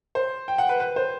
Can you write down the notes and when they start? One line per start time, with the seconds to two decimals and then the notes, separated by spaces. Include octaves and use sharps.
0.15 C5
0.48 G5
0.58 F#5
0.69 B4
0.80 B4
0.96 C5